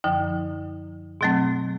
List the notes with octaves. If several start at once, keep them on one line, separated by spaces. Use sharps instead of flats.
F#2 D3 F3
B2 F#3 A3 C4